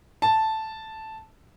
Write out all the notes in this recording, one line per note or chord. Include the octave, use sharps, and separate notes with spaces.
A5